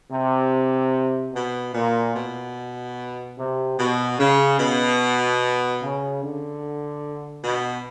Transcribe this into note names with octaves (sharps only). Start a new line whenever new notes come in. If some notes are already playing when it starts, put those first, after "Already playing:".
C3
B2
A#2
B2
C3
B2
C#3
B2
C#3
D3
B2